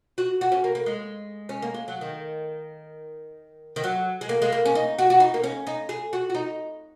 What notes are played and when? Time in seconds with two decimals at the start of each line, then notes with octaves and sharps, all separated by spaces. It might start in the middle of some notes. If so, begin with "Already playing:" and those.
0.18 F#4
0.41 F#4
0.52 C#4
0.64 A#3
0.75 A#3
0.86 G#3
1.49 C#4
1.62 A#3
1.74 G#3
1.88 F#3
2.01 D#3
3.76 D#3
3.84 F#3
4.21 G#3
4.29 A#3
4.42 G#3
4.52 A#3
4.65 C#4
4.75 D#4
4.99 F#4
5.10 F#4
5.20 D#4
5.34 A#3
5.44 C#4
5.67 D#4
5.89 G#4
6.13 F#4
6.30 F#4
6.35 D#4